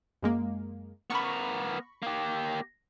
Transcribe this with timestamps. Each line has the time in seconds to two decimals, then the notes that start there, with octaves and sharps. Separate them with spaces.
0.23 F#2 G#3 A#3
1.10 B3 A#4 B5 C#6
2.02 A#3 G4